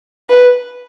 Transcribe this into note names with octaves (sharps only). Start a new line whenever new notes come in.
B4